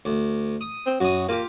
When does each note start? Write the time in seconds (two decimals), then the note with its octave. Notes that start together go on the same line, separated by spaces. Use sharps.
0.05 D2
0.61 D#6
0.86 C4
1.01 F#2 F#4 D#6
1.29 A#3 F4 G4